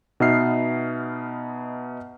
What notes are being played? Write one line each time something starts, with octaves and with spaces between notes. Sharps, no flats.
B2 B3 D#4 E5 F6 C7